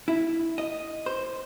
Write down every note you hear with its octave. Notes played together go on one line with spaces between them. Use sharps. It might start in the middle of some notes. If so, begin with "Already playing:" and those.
E4
D#5
C5